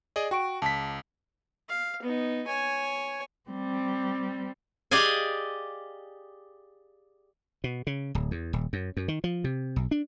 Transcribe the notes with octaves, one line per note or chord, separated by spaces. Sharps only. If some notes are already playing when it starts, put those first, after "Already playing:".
G#4 D5 D#5
F#4 G5 C#6 D7
C#2 A5 B6
F5
B3 D#4
C#5 G#5
G3 C4
G4 G#4 D5 D#5 F5 G#5
B2
C#3
D1
E2
D#1
F#2
F#2
D#3
F3
C3
B1
D4